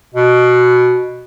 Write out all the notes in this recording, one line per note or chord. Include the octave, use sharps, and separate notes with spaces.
B2